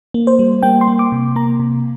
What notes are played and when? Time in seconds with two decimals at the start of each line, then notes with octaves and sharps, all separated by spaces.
0.14 A#3
0.27 C5
0.39 G3
0.63 A#3 G5
0.81 C6
0.88 A#3
0.99 D6
1.12 C3
1.36 A#3 A#5
1.60 C3